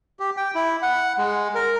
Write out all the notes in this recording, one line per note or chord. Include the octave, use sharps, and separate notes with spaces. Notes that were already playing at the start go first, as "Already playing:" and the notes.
G4
G5
E4
F#5
G#3
A#4